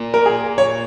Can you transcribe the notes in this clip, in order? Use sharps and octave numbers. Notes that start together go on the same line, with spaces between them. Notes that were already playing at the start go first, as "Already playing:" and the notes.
Already playing: A#2
A#4
G#4
C#5